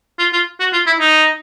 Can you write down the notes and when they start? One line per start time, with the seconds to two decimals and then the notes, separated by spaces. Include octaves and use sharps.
0.19 F4
0.33 F4
0.60 F#4
0.73 F4
0.87 E4
1.00 D#4